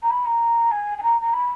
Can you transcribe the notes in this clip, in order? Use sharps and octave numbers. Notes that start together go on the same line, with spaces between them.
A#5
B5
A#5
G#5
G#5
A#5
A#5
B5